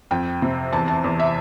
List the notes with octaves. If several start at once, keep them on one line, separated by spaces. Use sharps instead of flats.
F2 G5
C3
E2 A5
A5
E2
E5